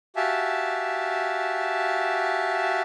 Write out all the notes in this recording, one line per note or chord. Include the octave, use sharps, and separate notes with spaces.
F#4 G4 E5 F5 G#5 A5